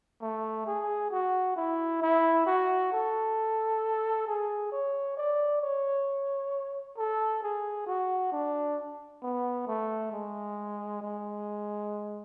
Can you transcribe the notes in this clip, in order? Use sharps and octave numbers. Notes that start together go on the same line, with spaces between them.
A3
G#4
F#4
E4
E4
F#4
A4
G#4
C#5
D5
C#5
A4
G#4
F#4
D4
B3
A3
G#3
G#3